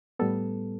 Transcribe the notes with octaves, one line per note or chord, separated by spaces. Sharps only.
A2 G3 B3 A4